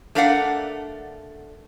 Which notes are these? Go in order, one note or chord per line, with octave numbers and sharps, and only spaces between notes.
A3 D4 A#4 D5 F5 F#5